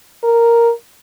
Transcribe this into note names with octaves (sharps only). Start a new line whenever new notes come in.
A#4